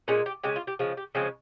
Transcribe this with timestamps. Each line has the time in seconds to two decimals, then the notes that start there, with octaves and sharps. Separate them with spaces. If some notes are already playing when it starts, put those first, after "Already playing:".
0.08 A#2 G#3 C#4
0.26 G4
0.43 C#3 G#3 G4
0.56 F4
0.67 G4
0.79 C#3 F3 G#3
0.97 G4
1.15 C#3 F3 G#3 C4